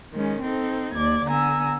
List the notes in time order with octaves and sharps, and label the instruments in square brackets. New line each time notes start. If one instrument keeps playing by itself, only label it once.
[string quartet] D#3 G#3 C#4
C4 D#4 A4
D#2 D5 G#6
D3 B3 G#5 A#5 E6